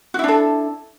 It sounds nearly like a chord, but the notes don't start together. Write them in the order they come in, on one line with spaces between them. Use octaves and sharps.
F#4 E4 D4 A4